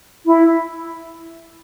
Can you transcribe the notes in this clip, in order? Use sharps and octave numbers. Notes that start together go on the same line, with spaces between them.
E4